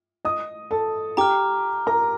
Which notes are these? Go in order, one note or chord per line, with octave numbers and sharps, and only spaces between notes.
D#5 D#6
A4 A5
G4 G5 A#5 D6 F6
A#4 A#5